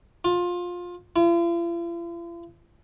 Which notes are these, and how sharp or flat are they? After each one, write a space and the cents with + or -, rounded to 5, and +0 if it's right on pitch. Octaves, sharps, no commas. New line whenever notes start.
F4 +20
F4 -45